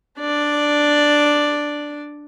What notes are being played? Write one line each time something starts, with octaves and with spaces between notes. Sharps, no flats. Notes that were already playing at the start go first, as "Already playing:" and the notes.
D4 D5